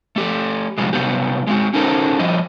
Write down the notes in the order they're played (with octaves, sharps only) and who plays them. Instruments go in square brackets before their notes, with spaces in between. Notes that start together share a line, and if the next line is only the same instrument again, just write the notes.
[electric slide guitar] A3 G4 A4
C3 F3 G3 G#3
C3 F#3 G3 B3 G4
G#3 C4 F#4
C#4 D#4 F#4 A4 A#4 C5
F3 G3 D#5